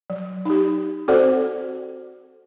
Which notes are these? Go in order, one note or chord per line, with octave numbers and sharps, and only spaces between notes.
F#3
D#4 G4
C4 F#4 A4 C5 D5 F#5